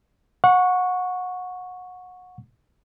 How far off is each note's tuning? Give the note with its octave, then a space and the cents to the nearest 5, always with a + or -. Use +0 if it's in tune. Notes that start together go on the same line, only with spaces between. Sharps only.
F#5 -25 C#6 +0